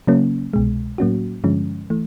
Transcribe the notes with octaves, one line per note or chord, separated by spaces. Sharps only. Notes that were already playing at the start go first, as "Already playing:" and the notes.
C#3 F#3 A#3 C#4
C2 B2 G#3
A2 F#3 A#3 C#4 F#4
G2 D3 F3 G#3 C#4
E3 A3